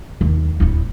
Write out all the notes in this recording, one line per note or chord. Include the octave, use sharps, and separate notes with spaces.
D#2
D1 E4